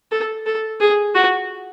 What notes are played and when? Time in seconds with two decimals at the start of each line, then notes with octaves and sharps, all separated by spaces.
0.12 A4
0.46 A4
0.81 G#4
1.15 F#4